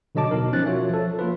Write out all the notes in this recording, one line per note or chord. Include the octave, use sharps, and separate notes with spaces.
B2 D3 F#3 D#5 A5 D6
B2 D#4 A#4
F3 C#4 F#6 A6
F4 F#4 C#5 E5
F3 A4
A#3 F4 B4